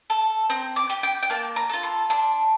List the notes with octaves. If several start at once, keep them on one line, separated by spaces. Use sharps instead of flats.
A4
C4 A#5
D6
G4
G5
G5
A#3 A5
A#5
F4 A4
C6
D4 C6